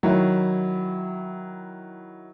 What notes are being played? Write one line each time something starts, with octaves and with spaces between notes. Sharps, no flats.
D#3 F#3 E4